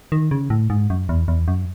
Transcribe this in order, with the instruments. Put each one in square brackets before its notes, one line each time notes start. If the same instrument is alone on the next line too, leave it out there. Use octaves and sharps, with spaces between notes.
[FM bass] D#3
C#3
A2
G#2
F#2
E2
E2
F#2